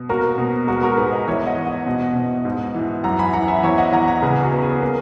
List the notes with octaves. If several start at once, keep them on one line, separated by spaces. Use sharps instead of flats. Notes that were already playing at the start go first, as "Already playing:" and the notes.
Already playing: B2
A#3 F#4 A#4
B2
G#3 F#4 A#4
F#4 A#4
G#2 G#4 B4
B4 D#5
E2 C#5 E5
D#5 F#5
E2
D#5 F#5
B2
B2
G#2
E3
F#2 F#5 A#5
G#5 B5
E3 F#5 A#5
E5 G#5
E2 C#5 E5
D#5 F#5
E2 F#5 A#5
F#5 A#5
C#3 G#4 B4
F#4
B3
G#4
A#3